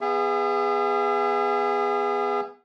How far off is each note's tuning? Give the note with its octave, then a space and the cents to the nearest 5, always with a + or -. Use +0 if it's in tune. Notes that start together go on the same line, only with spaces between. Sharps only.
B3 +0 G#4 -25 E5 +40